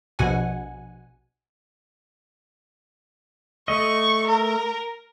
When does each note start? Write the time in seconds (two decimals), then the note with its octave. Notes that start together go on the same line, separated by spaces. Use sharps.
0.19 A#1 B2 F#5 G#5
3.68 A3 D#5 C#6
4.27 A#4